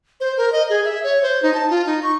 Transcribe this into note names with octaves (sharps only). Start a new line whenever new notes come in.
C5
A#4
D#5
G#4
E5
C#5
C5
D#4
A5
F4
D#4
C#6